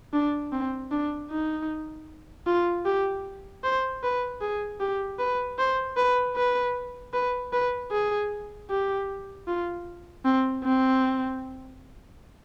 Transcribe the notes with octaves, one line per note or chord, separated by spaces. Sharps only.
D4
C4
D4
D#4
F4
G4
C5
B4
G#4
G4
B4
C5
B4
B4
B4
B4
G#4
G4
F4
C4
C4